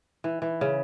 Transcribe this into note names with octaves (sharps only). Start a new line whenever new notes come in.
E3
E3
C#3